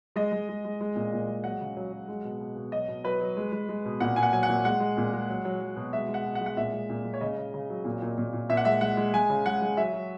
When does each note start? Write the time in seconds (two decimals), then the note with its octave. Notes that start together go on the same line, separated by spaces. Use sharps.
0.16 G#3 D#5
0.32 G#3
0.49 G#3
0.65 G#3
0.81 G#3
0.96 A#2
1.13 A#2
1.28 G#3
1.44 F#3 F#5
1.61 C#3
1.77 F#3
1.93 F#3
2.09 G#3
2.24 B2
2.40 B2
2.56 B2
2.72 F#3 D#5
2.88 B2
3.04 F#3 B4
3.21 F#3
3.37 G#3
3.52 G#3
3.69 G#3
3.85 B2
4.00 A#2 F#5
4.16 A#2 G#5
4.23 F#5
4.33 F#3 G#5
4.43 F#5
4.49 A#2
4.65 G#3 F#5
4.80 G#3
4.97 A#2
5.13 G#3
5.29 F#3
5.45 F#3
5.61 F#3
5.76 B2
5.93 G#3 E5
6.08 G#3
6.14 F#5
6.25 B2
6.35 F#5
6.41 G#3
6.46 F#5
6.57 A#2 E5
6.73 G#3
6.89 A#2
7.05 G#3
7.14 C#5
7.21 C#3 D#5
7.37 C#3
7.54 C#3
7.70 F#3
7.85 A#2
8.02 A#2
8.18 A#2
8.33 A#2
8.49 A#2 E5
8.57 F#5
8.65 G#3 E5
8.81 G#3 F#5
8.97 G#3
9.13 G#3 G#5
9.30 C#3
9.46 G#3 F#5
9.61 G#3
9.77 F#3 E5
9.93 F#3